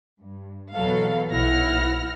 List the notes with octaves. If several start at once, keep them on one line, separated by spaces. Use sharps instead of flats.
G2
E2 B2 F#3 A4 F5
B1 E4 F#5 F6 A#6